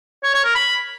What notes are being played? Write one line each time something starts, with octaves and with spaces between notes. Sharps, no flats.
C#5
C#5
A#4
B5